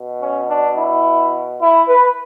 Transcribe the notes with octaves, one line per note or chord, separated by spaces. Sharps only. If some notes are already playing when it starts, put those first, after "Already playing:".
Already playing: B2
C#4
D4
E4
E4
B4